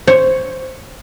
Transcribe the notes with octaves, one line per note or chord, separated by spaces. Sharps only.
C5 C#5